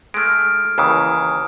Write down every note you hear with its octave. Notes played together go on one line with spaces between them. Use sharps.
G#3 A3 F6 D7
D#2 C#3 E3 A#5 D#6